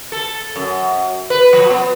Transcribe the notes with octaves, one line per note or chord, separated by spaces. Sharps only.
A4
F#2
B4
F3
B3